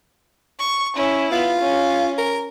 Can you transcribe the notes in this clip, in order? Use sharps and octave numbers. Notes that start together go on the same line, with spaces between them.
C#6
C#4 E4
B3 F4
C#4
A#4